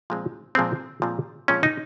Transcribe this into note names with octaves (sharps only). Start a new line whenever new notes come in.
A#2 F3 G#3 C4
A#2 F3 G#3 C4
A#2 F3 G#3 C4
A#2 F3 G#3 C4 C#4
D#4